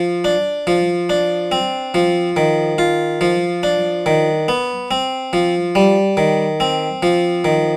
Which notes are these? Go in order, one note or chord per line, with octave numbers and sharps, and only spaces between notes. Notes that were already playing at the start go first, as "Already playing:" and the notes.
Already playing: F3
D4
F3
D4
C4
F3
D#3
F4
F3
D4
D#3
B3
C4
F3
G3
D#3
C4
F3
D#3